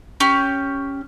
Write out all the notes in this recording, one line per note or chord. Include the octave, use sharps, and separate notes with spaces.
C#4 G4